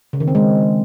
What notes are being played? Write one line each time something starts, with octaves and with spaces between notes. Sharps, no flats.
C#3
D#3
C4
G#3